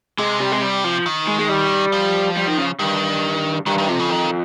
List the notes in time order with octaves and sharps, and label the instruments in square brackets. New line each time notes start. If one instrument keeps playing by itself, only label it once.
[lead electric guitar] C3 [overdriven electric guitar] G#3
[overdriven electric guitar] G3
G#3
G3
F3
[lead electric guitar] D#3
[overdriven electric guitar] G#3
G#3
G3
[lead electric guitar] F3
[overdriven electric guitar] G3
D#3
C#3
[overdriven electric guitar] G2 [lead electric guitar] D#3
[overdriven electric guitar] G2 [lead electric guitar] D#3
[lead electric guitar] D#3
[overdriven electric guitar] F2 [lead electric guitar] C3
[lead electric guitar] C#3
D#3